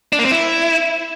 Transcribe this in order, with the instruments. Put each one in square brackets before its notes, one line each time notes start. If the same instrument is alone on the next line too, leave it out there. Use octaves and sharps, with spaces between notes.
[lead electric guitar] D4
A#3
C4
E4